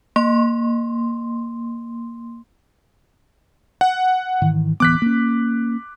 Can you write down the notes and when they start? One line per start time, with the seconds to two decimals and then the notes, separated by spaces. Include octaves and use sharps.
0.16 A#3 C6
3.81 F#5
4.41 G#2 D#3 E3
4.80 D1 E3 B3 D6 F#6 B6
5.02 A#3 C#4